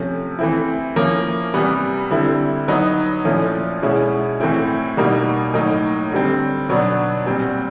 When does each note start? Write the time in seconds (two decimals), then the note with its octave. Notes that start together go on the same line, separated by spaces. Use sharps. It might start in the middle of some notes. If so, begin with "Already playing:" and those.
Already playing: C3 F3 A3 C#4
0.39 E3 A3 C4 E4
0.96 F3 A#3 C#4 E4
1.54 C3 E3 G3 B3
2.11 D3 G3 C4 E4
2.68 F#3 B3 D#4
3.25 A#2 F3 A3 C#4 E4
3.82 B2 G#3 C#4 E4
4.40 A2 E3 A3 C4 E4
4.97 B2 G3 A#3 D#4
5.54 A2 F#3 A#3 D#4
6.12 D3 G3 C4
6.69 B2 F#3 B3 D4
7.26 A#2 G3 C4